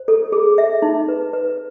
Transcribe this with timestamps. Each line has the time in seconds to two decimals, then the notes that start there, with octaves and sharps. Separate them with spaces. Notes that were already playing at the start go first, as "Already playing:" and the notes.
Already playing: C5
0.08 A4
0.32 G#4
0.58 E5
0.82 D#4
1.08 B4
1.33 B4